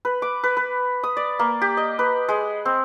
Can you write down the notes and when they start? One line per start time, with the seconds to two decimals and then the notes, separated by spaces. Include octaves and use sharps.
0.05 B4
0.22 D6
0.44 B4
0.57 B4
1.03 D#6
1.17 D5
1.39 A#3
1.62 G4
1.77 D#5
1.99 B4
2.29 G#3
2.65 C4